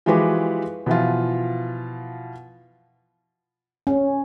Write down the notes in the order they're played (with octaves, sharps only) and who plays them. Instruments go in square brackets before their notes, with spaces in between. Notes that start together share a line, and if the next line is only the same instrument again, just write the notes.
[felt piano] E3 F3 G#3 F#4 G4 B4
B2 E3 F3 F4
[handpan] C#4